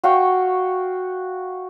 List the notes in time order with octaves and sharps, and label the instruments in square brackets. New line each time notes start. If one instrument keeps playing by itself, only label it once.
[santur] F#4 F5 G5 C#6